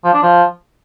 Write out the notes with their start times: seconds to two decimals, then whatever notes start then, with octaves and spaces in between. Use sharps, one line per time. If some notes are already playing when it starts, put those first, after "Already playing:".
0.04 F3
0.13 D4
0.23 F3